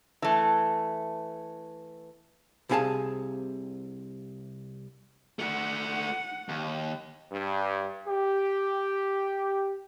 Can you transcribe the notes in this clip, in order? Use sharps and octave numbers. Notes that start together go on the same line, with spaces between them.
E3 A3
C2 C3 E4 G#4 F5 A5
A3 F#4 F#5
D#2
G2
G4